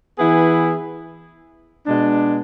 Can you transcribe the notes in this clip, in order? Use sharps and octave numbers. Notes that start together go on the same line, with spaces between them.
E3 B3 E4 G#4
B2 G#3 D4